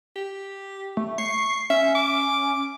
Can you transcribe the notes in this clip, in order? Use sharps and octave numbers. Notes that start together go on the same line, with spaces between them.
G4
A3
C#6 C7
C#4 E5
D6